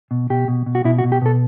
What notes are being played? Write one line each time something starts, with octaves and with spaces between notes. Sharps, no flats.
B2
B2 G4
B2
B2
F#4
B2 E4
F#4
B2
G4
B2 A4